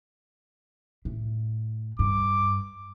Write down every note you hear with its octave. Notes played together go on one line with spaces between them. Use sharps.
A2
G2 D6